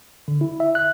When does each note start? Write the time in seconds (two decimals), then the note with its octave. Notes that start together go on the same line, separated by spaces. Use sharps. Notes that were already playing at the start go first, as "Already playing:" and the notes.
0.28 D3
0.41 E4
0.60 E5
0.75 F#6